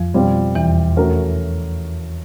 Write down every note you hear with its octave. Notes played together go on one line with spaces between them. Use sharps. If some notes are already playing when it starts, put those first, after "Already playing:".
Already playing: F2 F3
B2 G3 C4 F4
E2 E3
A3 C#4 F#4 A#4